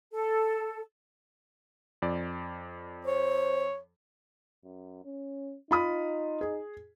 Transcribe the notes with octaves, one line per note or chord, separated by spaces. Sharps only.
A4
F2 D5
C5 C#5
F#2
C#4
D#4 F4 B5 D#6
G#4